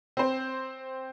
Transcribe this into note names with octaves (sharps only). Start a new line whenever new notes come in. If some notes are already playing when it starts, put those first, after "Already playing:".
C4 C5